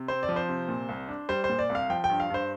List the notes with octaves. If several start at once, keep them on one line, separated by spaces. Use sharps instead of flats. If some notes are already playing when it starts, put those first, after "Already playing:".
Already playing: C3
C4 C5
D5
F3
C5
C3
A#2
C2
D4
G3 C5
C5
A#2
D5
C2
F5
F3 G5
G5
G2
F5
G2 C5